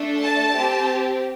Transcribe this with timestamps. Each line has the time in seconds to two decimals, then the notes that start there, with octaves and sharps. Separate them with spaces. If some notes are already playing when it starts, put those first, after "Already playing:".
Already playing: A3 D4 A4
0.22 A5
0.54 C4 G4